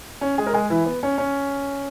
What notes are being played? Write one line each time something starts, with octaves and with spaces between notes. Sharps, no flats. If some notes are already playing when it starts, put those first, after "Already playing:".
C#4
G#3 G#4
A#4
G#3 G#4
E3 E4
B3
C#4
C#4